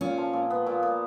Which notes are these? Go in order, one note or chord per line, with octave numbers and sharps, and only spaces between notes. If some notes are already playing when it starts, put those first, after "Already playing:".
A#2 C#4 F4
F3
A#2
B3
A#2
A#2